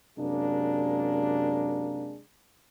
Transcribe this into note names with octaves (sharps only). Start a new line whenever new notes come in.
F#2 C3 G#3 A#3 D4